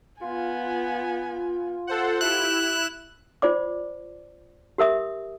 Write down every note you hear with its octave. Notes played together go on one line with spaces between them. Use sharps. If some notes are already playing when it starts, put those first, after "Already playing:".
B3 F4 G#5
A4 C5 F#5
E4 G4 G5 F#6 E7
F4 C5 D5 D6
G4 A#4 E5 D#6